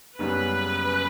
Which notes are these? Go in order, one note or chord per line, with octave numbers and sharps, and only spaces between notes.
F#1 F#2 C#3 G3 B3 B4